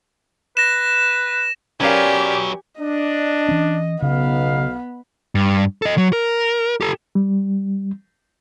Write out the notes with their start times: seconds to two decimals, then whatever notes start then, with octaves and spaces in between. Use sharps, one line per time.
0.57 B4 A#6 E7
1.81 F#3 C#4 G4 G#4 A#4 B4 D5 F5
2.80 D4 D#5
3.49 E3 C#4
4.02 B1 C#3 B3 D#4 F5
5.35 G2
5.82 A4 D#5
5.98 F#3
6.13 A#4
6.81 G4 A4
7.15 G3